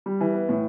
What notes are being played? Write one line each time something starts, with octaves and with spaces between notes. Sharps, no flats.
G3
E3
B3
A2